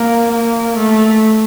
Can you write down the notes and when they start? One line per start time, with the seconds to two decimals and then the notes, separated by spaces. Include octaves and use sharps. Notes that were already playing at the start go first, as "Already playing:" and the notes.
Already playing: A#3
0.33 A#3
0.77 A3